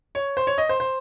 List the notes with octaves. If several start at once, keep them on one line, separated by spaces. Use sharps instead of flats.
C#5
C5
C#5
D#5
C5
C5